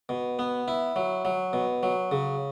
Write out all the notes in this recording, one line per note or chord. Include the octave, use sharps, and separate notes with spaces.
B2
B3
E4
F#3
F#3
B2
F#3
C#3